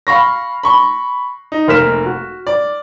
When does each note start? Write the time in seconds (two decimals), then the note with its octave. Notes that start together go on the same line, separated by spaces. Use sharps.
0.07 F5 B5 C#6 A#6
0.63 B5 C#6
1.52 D#4
1.68 F1 A#3 A#4 F6 B6 E7
2.06 F#4
2.47 D5